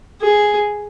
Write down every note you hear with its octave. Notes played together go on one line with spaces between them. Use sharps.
G#4